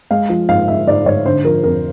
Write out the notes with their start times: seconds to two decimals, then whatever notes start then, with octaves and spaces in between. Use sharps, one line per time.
0.11 G#3 F5
0.29 F3
0.49 G#2 F5
0.68 G#2 E5
0.87 G#2 D5
1.06 G#2 C#5
1.26 D3 C5
1.45 F3 A#4
1.64 F2 A#4